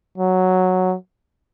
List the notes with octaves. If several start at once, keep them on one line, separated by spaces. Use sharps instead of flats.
F#3